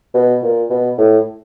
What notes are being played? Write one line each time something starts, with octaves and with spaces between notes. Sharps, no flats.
B2
A#2
B2
A2